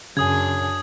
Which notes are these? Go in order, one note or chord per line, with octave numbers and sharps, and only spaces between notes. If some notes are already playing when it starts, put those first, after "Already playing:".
F#2 C#3 D4 G#4 D#6 G#6